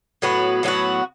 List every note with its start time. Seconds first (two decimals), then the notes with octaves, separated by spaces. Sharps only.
0.22 A2 F#3 B3 F#4
0.63 A2 F#3 B3 F#4